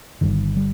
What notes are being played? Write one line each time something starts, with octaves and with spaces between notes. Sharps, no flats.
G1 G2 D3 D#3
G3